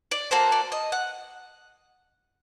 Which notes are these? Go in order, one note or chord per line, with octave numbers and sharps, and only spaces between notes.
D5
A#3 F#4 A4 C5
D5
D#5
F#5